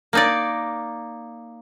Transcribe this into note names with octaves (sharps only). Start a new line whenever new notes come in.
A#3 D#4 D5